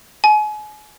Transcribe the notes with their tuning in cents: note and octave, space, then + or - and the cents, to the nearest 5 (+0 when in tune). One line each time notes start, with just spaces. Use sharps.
G#5 +35